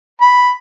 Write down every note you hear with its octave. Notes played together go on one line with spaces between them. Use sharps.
B5